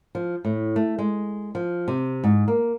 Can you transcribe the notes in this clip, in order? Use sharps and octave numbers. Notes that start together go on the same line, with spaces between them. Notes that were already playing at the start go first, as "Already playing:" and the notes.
F3
A2
A3
G#3
F3
C3
G#2
A#3